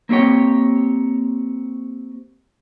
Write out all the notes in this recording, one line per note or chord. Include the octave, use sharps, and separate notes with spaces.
A#3 C4 G4 C#5 G5